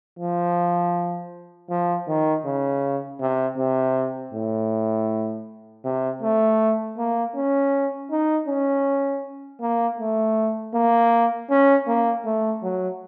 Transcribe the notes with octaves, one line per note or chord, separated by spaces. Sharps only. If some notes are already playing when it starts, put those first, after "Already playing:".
F3
F3
D#3
C#3
C3
C3
A2
C3
A3
A#3
C#4
D#4
C#4
A#3
A3
A#3
C#4
A#3
A3
F#3